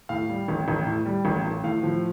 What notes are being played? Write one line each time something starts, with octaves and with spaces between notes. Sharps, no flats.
A2 F5
G3
A1
A1
A2
G3
A1
A1
A2 F5
F3